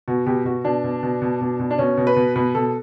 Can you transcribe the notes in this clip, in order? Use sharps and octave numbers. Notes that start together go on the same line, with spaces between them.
B2 F#4
B2 G4
B2 F#4
B2 D4
B2
B2
B2
B2
B2
D4
B2 C#4
B2
B4
B2
B2 B4
B2 A4